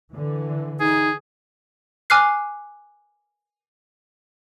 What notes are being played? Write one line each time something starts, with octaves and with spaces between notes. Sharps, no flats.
D3 E3
D#4 G#4
G#5 D6 F6 F#6 C7